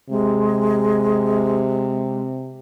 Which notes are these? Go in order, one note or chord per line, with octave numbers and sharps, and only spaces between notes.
C3 G#3